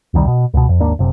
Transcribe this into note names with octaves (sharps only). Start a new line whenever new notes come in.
E1 C2 D#3 G3
B2
C#2 B2
F2
G#1 D#2 A#3 D4
F#1 C3